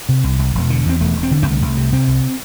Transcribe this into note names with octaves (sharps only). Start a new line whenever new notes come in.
C3
C2
C2
E1
D3
E2 C4
E1 A3
E1
C4
D3
C4
C2 A3
C2
C3
C3 C4
C2